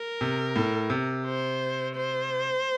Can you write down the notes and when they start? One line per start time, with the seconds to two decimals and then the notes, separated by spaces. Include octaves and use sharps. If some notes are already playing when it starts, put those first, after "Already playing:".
Already playing: A#4
0.21 C3
0.56 A2
0.90 C3
1.25 C5
1.95 C5